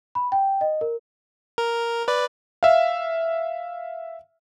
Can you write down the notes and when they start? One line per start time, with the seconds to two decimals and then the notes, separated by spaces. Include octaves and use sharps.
0.15 B5
0.32 G5
0.61 D#5
0.81 A#4
1.58 A#4
2.08 B4 D5
2.63 E5 F5